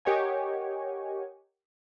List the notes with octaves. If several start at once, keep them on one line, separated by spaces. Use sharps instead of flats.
G4 A#4 C#5 D#5 F#5 G#5